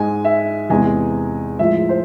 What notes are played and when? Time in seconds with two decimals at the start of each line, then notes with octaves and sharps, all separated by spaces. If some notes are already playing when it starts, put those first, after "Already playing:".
Already playing: G#2 G#3 G#5
0.25 E5
0.70 E2 C3 G#3 G#5
1.59 A2 F3 G#3 E5
1.89 C5